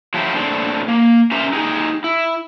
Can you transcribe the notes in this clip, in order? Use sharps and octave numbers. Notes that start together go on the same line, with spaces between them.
F3 F#3 A3 E4 G4 C5
A2 C4 D4
A#3
C#4 G4 A#4 C5 E5 A#5
D#4 G4 G#4
E4